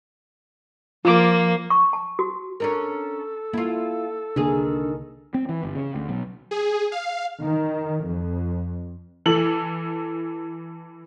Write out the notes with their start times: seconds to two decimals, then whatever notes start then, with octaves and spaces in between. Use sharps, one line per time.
1.05 F3 A#3 F4 D6
1.70 C#6
1.93 A5
2.19 F#4
2.60 C#4 D4 A4 A#4
3.53 A#3 E4 F4
4.36 C2 D3 D#3 A#3 D4 G#4
5.34 C4
5.49 E3
5.63 G1
5.75 C#3
5.95 D2
6.09 B1
6.51 G#4
6.92 F5
7.41 D#3
8.05 F2
9.26 E3 A4 F#7